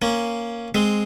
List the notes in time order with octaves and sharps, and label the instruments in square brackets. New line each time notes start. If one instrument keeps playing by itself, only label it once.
[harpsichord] A#3 C#4
G#3 C4